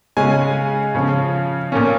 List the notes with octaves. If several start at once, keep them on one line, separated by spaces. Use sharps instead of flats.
C#3 G#3 C#4 G#5
C#3 F3 C#4
A#2 A#3 C#4